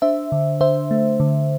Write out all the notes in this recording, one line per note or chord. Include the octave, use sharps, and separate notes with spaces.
D4 C5 E5
D3
D3 C5 E5
A3
D3